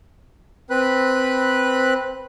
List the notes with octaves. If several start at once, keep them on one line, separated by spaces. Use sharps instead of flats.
C4 B4 B5 F#6